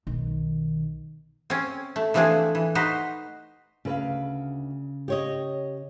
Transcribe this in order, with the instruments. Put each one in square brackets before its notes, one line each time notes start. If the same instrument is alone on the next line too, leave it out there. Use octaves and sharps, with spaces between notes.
[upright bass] B1 D#3
[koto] C4 C#4
A3
E3 F3 A3 C4 D4 G#4
E3
D#4 F#4 B4 C5
[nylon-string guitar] D2 B4 F5 [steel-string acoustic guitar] C#3
[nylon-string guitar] G4 C#5 D#5